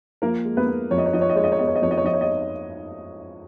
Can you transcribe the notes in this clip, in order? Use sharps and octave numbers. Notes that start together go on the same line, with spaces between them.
F3 A#3 A#4
G#3
B3 B4
B3
F2 C#5
D#5
C#5
F3 D#5
C#5
D#5
G#3 C#5
D#5
C#5
B3 D#5
C#5
D#5
F2 C#5
D#5
C#5
F3 D#5
C#5
D#5